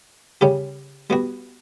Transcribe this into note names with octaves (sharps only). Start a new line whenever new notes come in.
C#3 G3 C#4 G4
G3 B3 F#4